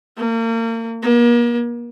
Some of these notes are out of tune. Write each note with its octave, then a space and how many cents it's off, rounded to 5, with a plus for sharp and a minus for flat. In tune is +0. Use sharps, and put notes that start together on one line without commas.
A#3 -35
A#3 +40